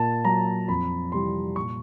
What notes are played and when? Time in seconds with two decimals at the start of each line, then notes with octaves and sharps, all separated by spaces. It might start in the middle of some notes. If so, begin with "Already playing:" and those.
Already playing: A#2 A5
0.25 F#3 A#5
0.68 F2 B5
1.12 C3 E3 G3 C6
1.56 A#2 C#6